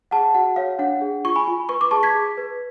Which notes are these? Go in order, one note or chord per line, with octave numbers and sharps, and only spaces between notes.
G#4 F#5 A5
F#4 F#5
C#5 F5
D4 F#5
G#4
F4 C#6
G#5 B5
F4
B4 C#6
D6
G#4 A5 C#6
G#6 B6
G#4
B4